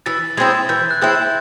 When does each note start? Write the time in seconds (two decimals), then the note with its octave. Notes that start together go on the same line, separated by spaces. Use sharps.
0.06 E3 A6
0.37 G#3 C4 E4 G#6
0.69 E3 G6
0.91 F#6
1.01 G#3 C4 E4